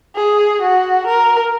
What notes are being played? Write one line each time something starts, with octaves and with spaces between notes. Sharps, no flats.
G#4
F#4
A#4